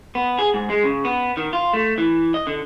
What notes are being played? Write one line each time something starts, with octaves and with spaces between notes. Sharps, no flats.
B3
G#4
G#2
G#3
C#3
B3
D#3
F4
A3
E3
D#5
D3